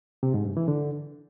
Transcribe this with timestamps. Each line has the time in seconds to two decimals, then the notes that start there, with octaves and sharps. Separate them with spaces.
0.23 C3
0.34 G#2
0.45 G2
0.57 E3
0.68 D3